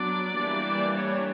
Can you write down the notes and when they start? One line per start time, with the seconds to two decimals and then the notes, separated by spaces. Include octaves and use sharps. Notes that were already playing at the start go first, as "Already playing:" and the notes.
Already playing: F#3 B3 D4 D5
0.36 E3 G3 A#3 D4
0.95 C#5